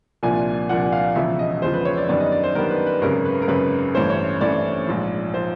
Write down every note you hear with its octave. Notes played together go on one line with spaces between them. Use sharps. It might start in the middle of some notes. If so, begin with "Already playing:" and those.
C2 A#2 F3 A#3 D4 G#5
C2 A#2 F3 A#3 D4 F#5
F5
E1 E2 C#3 F3 E5
D#5
E1 E2 C#3 F3 C5
B4
C#5
D5
F#2 D#3 G3 B3 D4 D5
D#5
D5
C5
F#2 D#3 G3 B3 D4 A#4
B4
B4
G#1 F#2 C#3 A#4
B4
A#4
G#1 F#2 C#3 B4
A1 G2 E3 A3 C#4 C5
C#5
A1 G2 E3 A3 C#4 D5
A#1 G#2 F3
F3 C5